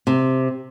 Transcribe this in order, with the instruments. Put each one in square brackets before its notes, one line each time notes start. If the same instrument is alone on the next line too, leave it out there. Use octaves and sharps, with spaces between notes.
[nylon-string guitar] C3